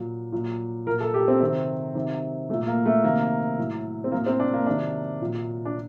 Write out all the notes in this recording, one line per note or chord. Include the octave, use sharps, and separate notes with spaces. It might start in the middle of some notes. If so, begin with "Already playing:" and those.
Already playing: A#2 F#3
A#2 F#3
A#2 F#3 A#4
A4
G4
C4
C3 D#3 F#3 C4
C3 D#3 F#3
A#2 F#3 A3
A#3
A3
C3 D#3 F#3 A#3
A2 F#3
C4
A2 F#3 A#3
C4
D4
A#3
C3 D#3 F#3 D4
A#2 F#3
D4